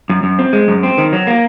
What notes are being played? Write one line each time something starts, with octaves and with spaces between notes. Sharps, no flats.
F#2
F#2
C4
G#3
F#2
C4
D#3
F#3
A#3